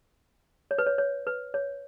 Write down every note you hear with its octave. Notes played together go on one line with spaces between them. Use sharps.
C#5
B4
C#5
C#5
B4
C#5